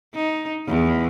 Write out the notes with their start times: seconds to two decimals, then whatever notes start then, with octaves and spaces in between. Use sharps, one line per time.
0.15 D#4
0.68 E2